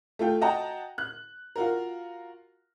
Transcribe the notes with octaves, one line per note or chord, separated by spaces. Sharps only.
A3 F4 G5
F#4 D#5 F#5 G5 A5 A#5
F#6
F4 F#4 A#4